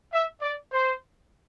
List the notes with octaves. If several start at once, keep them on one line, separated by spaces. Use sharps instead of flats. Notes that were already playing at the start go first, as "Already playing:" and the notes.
E5
D5
C5